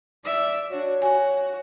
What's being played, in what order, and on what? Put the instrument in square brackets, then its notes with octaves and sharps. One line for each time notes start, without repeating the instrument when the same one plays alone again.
[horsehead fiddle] D5 E5
[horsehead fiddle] D4 F#4 [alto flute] C#5
[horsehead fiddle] F#4 [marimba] G#5